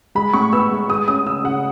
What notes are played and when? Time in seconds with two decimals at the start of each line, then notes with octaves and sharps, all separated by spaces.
0.15 G#3 B5
0.34 A2 C#6
0.53 B3 E6
0.71 G#3
0.89 G#3 D#6
1.07 C#4 D#6
1.26 C#3 E6
1.44 C#3 F#5